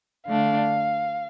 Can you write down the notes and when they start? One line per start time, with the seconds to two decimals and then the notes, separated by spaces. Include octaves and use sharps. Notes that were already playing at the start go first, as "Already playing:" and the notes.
0.27 D3 A3 D4 F5